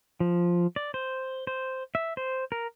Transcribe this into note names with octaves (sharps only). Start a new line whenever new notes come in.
F3
D5
C5
C5
E5
C5
A#4